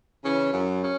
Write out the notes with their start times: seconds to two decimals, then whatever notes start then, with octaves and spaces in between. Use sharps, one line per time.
0.22 C#3 E3 C#4
0.52 F#2
0.83 C#4